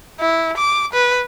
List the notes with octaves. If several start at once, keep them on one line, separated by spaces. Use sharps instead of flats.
E4
D6
B4